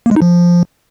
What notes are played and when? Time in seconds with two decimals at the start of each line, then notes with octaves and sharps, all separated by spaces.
0.06 A#3
0.11 G#3
0.16 D#4
0.22 F3